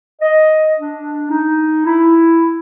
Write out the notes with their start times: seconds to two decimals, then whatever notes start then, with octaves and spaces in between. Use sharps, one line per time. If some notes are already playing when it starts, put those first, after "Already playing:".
0.20 D#5
0.78 D4
1.30 D#4
1.85 E4